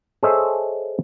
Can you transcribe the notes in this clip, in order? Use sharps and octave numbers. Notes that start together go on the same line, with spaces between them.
G#4 A4 C5 C#5 D#5 E5